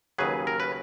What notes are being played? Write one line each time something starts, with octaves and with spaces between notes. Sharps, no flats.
D#2 C#3 F#3 G#4 B4
A#4
B4